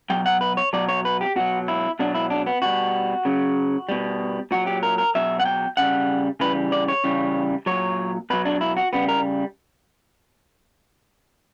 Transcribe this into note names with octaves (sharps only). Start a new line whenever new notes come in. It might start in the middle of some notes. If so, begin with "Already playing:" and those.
B2 F#3 G5
F#5
B4
C#5
B2 F#3 D5
C#5
B4
G4
B2 F#3 F#4
E4
B2 F#3 D4
E4
D4
B3
B2 G3 F#4
C#3 F#3
B2 G3
A#2 F#3 F#4
G4
A#4
A#4
B2 F#3 E5
F#5
G5
C#3 G3 F#5
C#3 E3 G3 B4
D5
C#5
C#3 E3 G3
A#2 F#3 C#5
B2 F#3 B4
D4
E4
F#4
C#3 G3 B3
A#4